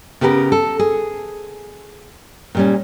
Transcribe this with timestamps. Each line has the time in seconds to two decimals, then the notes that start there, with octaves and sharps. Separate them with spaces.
0.21 C#3 B3 G4 A4 A#4
0.52 A4
0.79 G#4
2.55 A#2 G3 C#4